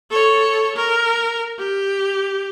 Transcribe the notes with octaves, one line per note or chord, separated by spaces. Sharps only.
A4 C#5
A#4
G4